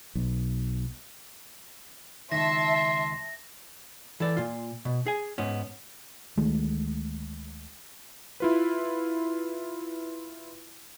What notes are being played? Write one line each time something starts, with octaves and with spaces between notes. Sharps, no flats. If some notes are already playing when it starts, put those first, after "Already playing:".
B1
C#2 G2 D#3 E5 A5 C6 A#6
E3 A4 D5
A#2 F4
B2
G#4 G#5
G#2 B3 C#4
D2 D#3 G#3 A3
E4 F4 B4